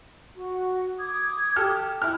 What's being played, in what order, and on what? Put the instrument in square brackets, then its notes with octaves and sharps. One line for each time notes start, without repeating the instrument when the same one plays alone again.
[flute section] F#4
D6 D#6 G#6
[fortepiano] G4 A4 F6
E4 F6